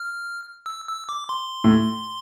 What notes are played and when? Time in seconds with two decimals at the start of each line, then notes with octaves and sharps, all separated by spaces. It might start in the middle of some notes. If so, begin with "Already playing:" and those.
Already playing: F6
0.66 E6
0.88 E6
1.09 D6
1.29 C6
1.64 A2